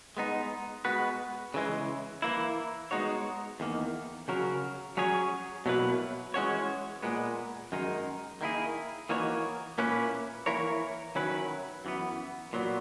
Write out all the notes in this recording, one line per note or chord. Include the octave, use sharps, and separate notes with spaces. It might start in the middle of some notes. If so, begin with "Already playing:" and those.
G#3 B3 D#4
G#3 B3 F#4 B4
C#3 E3 G#3
E3 A#3 E4
G#3 B3 D#4 F#4 C#5
E2 D#3 A#3
C#3 F#3 C#4 F#4 A#4
F#3 C#4 G#4 C#5
B2 F#3 A#3 E4 B4
E3 G#3 C#4 F#4 C#5
A#2 G#3 B3
F#2 D#3 G#3 D#4
D#3 A#3 E4 G#4
E3 A#3 D#4 F#4 C#5
A#2 A#3 C#4 E4 B4
E3 A#3 E4 A#4 C#5
D#3 F#3 C#4 E4 B4
F#2 E3 B3
A#2 F#3 B3